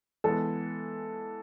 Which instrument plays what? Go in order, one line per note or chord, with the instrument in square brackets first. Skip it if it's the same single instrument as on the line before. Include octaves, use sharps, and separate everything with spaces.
[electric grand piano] E3 G#3 B3 [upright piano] A4